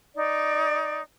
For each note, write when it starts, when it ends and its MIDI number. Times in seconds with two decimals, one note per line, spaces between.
0.16 0.99 63
0.16 0.99 74